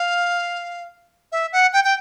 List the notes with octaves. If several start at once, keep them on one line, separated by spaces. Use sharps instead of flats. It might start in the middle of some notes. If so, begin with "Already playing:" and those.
Already playing: F5
E5
F#5
G5
G5